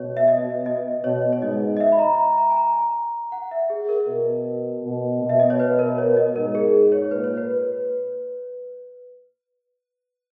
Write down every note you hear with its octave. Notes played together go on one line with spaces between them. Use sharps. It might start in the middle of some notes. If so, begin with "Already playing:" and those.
Already playing: B2 C#5
E5
D#5
D#5
B2 C#5
C#5
G#2 D#5
D#5
E5
B5
A#5
A#5
A#5
G#5
A#5
F#5
E5
G#4
A#4
B2
B2
B2
E5
D#5
C#5
B4
A#4
C#5
D#5
G#2 A#4
G#4
C#5
A#2 B4
C#5
B4